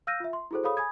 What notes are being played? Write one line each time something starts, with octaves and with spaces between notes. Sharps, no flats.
F5 E6 F6 G6 A#6 D#7
F4 E5
C6
E4 F#4 G#4 A4 C5
G#4 A4 C#5 F5 B5 D#6
G#5 B5 D#6 G#6